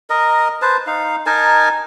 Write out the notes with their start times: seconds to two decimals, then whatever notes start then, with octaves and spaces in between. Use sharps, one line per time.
0.10 A#4 D#5
0.62 B4 C5 A5
0.87 D#4 F5
1.26 D#4 A#4 G#5 A5